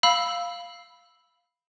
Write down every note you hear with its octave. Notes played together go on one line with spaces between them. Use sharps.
F5 B5 E6